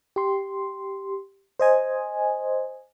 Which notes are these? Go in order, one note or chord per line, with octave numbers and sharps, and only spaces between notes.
G4 C6
C5 D#5 G#5